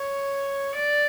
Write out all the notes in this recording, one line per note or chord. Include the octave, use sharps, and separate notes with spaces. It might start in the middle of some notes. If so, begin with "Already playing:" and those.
Already playing: C#5
D5